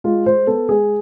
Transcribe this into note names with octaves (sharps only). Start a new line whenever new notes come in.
G#3 F4
G#3 C5
B3 A4
G#3 G#4